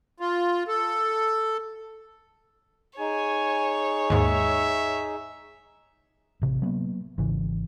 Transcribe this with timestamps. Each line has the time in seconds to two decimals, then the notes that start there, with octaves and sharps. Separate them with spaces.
0.20 F4
0.68 A4
2.99 D#4 G#4 C#5 G#5
4.10 D#2 G#2 E5
6.42 A1 C3
6.62 F#3 A#3 B3
7.18 G#1 C#3 E3